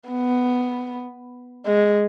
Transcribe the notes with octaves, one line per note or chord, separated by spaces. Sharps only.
B3
G#3